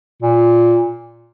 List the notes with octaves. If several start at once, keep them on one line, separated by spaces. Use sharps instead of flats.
A#2